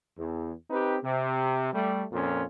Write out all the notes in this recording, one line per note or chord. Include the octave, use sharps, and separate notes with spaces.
E2
C4 D#4 G4 B4
C3
G3 A3
F2 A#2 C#4 F4